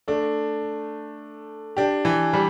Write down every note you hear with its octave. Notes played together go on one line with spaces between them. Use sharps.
A3 D4
D4 G4
E3
G3